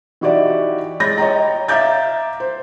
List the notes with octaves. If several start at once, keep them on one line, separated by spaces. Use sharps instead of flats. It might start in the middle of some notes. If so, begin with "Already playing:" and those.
E3 D#4 F#4 G4 D5 E5
G#3 C#5 B5 G6 A6 A#6
C#5 D#5 G5 A#5
E5 F5 A#5 D6 G6 A6
C5